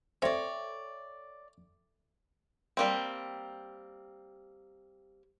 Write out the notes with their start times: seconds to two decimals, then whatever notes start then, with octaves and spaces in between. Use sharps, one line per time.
0.22 C4 A4 C#5 D5 E5 G5
2.77 G3 A#3 C4